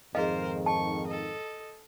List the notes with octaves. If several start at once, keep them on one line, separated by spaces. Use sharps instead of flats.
F2 G#2 D#3 G#4 A#4 C5 D#5 F5
A5 C#6
A4 D#5